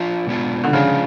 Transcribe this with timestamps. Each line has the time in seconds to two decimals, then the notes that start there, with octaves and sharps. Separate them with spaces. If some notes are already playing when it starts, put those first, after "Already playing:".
Already playing: F3 D4 F4
0.27 B2 G#3 B3 D4 F4
0.64 D3
0.73 C#3 F3 G#3 D4 F4